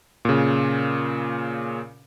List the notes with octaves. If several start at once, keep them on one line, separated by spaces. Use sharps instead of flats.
A#2 C#3